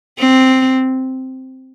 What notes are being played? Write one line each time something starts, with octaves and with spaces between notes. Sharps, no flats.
C4